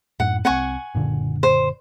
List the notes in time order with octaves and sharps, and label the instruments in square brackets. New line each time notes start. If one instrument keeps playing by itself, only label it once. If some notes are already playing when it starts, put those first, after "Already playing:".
[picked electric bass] F#2 A2 [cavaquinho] F#5
[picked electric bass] C2 C4 [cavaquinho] F#5 G#5 C#6
[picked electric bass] F#1 A#2 D3
[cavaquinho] C5